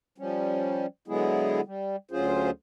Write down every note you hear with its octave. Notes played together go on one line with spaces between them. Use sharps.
F3 G3 C#4
D3 F#3 G#3 B3 E4 G#4
G3
D2 F#3 C#4 F4 G#4 C5